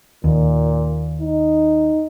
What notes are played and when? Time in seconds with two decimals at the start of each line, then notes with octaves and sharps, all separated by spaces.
0.24 D#2 A#2
1.21 D#4